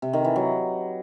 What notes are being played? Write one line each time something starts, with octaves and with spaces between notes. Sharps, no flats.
C3
D#3
E3
F#3